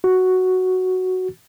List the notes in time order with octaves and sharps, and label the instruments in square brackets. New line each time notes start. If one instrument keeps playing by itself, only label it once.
[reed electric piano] F#4